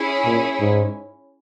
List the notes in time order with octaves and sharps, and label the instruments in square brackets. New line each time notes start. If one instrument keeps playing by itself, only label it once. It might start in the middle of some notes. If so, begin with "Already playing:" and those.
Already playing: [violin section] C#4 E4 G#4
[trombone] A#2
G#2